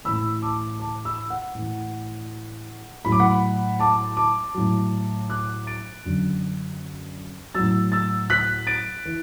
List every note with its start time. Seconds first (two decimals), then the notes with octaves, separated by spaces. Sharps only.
0.04 A2 E3 B5 E6
0.42 A5 D6
0.80 A5 D6
1.05 B5 E6
1.30 F#5
1.55 A2 E3
3.05 A2 F#3 B5
3.12 D6
3.19 F#5 B5
3.79 A5 D6
4.17 A5 D6
4.54 A2 F#3
5.29 D6 F#6
5.67 A6 D7
6.05 F#2 D3 F#3
7.55 A2 F#3 E6 A6
7.92 E6 A6
8.30 F#6 B6
8.67 A6 D7
9.05 E3